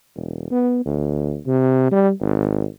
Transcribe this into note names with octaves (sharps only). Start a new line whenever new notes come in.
E1
B3
D2
C3
G3
G#1